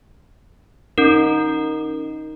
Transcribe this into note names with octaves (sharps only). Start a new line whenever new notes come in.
C#4 D#4 A#4